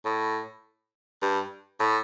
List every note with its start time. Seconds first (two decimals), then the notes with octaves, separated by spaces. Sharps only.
0.05 A2
1.22 G2
1.80 A2